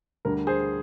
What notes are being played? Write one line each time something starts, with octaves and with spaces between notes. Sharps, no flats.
D2 D3 G3 D4 A#4
G#4 C5